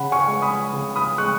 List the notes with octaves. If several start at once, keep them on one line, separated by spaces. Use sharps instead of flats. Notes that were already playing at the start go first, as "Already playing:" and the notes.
Already playing: C#3 F#5 B5
G#5 C#6
G#3
B5 D#6
C#3
B5 D#6
G#3 C#6 F#6